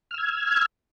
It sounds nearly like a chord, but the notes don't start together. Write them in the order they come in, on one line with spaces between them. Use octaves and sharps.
F6 E6 G#6